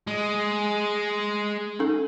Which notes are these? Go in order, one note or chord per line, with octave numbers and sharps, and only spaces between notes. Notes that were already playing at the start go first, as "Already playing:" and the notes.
G#3
C#4 D#4 A4